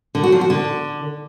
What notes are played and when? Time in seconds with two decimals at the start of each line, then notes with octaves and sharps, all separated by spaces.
0.15 D3
0.23 F#4
0.32 F3
0.41 F#4
0.50 D3